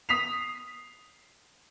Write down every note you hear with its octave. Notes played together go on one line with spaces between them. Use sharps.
D#6 B6 C7 F7